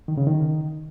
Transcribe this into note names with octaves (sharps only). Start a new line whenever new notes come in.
D#3
C#3
D#3